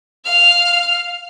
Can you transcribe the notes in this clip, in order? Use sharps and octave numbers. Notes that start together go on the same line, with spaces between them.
F5 F6